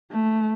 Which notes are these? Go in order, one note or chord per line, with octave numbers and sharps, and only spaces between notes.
A3